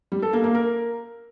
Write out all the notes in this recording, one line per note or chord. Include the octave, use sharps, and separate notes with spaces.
G3
A4
A#3
A#3
A#4